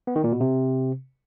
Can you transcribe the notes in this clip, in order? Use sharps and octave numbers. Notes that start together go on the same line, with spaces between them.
B3
D#3
A#2
B2
C3